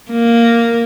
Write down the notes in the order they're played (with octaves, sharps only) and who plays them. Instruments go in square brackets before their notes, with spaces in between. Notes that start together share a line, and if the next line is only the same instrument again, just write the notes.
[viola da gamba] A#3